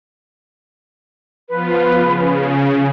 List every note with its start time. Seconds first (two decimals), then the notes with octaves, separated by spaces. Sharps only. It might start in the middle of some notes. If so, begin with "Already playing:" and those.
1.49 F3 B3 F4 B4
1.97 C#3